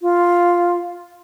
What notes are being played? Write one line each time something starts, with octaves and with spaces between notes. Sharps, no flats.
F4